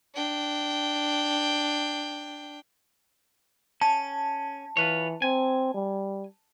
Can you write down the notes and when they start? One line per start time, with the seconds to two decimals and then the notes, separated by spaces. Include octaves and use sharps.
0.15 D4 G5
3.81 C#4 A5
4.77 E3 F4 B4 C#5
5.22 C4 G#5
5.74 G3